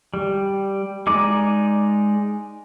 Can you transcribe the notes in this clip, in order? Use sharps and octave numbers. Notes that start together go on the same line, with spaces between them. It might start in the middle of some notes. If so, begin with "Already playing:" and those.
G3
G#3 D#4 D5 D6